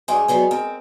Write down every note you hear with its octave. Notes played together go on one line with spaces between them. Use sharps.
G2 G3 G#3 G#4
F#3 G3 B3
C4 A#4